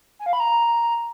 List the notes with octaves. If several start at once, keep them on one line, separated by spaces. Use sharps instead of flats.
G#5
F5
B5
A#5